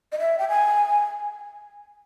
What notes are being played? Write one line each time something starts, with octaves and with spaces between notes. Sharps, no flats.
D#5
E5
G5
G#5